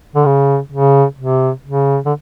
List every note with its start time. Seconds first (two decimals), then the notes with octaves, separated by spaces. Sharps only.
0.16 D3
0.26 C#3
0.72 C#3
1.19 C3
1.66 C#3
2.06 D3